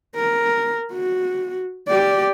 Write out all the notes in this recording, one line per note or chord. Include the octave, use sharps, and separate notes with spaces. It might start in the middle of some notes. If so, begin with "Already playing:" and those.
A#4
F#4
G4 D5